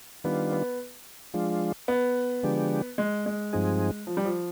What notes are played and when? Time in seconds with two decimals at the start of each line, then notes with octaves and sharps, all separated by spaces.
0.24 D#3 G3 B3 D4 F4
0.52 B3
1.34 F3 G#3 D4 F4
1.88 B3
2.43 D3 F3 G#3 D4 G4
2.98 G#3
3.26 G#3
3.53 G2 F3 C4 D#4 G#4
4.07 F3
4.17 G3
4.25 F3